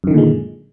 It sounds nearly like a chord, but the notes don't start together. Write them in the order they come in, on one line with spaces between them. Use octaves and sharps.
F#2 D#3 D3 A#2 G#3